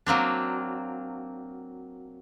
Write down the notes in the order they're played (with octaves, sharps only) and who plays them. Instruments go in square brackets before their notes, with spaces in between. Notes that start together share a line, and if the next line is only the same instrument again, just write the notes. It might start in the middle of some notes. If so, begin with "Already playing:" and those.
[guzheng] F#3 A#3 C4 D4